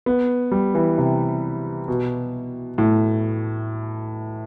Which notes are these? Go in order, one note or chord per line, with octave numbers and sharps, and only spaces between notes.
B3
G3
E3
C3
B2
A2